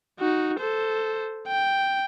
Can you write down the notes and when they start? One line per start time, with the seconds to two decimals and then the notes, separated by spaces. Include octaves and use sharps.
0.20 D#4 F#4
0.60 A4 C5
1.48 G5